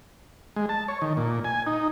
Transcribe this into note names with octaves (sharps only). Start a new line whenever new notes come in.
G#3
A5
C#5
D#3
A#2
G#5
D#4